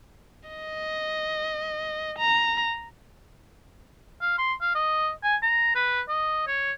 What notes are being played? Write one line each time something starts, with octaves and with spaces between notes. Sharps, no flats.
D#5
A#5
F5
C6
F5
D#5
G#5
A#5
B4
D#5
C#5